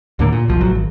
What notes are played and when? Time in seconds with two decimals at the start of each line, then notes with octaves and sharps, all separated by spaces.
0.19 D#2 A2 D3 A#3
0.32 A#2
0.48 F#1 C2 F3
0.61 A1 F#3
0.75 G#1